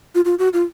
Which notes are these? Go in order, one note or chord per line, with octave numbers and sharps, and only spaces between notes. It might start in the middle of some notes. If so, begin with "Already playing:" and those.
F4
F4
F#4
F4